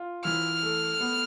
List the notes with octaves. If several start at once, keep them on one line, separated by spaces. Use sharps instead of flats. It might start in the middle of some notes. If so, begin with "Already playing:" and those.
Already playing: F4
E3 F6
A3
B3